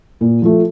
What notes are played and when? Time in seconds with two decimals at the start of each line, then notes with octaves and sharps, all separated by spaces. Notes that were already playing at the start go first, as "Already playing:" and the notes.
0.21 A#2
0.42 F3 A3